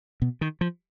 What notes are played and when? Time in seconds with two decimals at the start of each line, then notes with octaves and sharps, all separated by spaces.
0.22 B2
0.41 D#3
0.61 F3